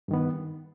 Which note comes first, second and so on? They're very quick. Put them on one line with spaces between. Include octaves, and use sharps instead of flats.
G2 D#3 B3